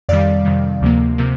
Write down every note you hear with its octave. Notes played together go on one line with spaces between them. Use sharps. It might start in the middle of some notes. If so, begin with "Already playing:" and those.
F2 C3 D#3 G3 D5 F5
F2 C3 D#3 G3
D2 C3 F3 A#3
C3 F3 A#3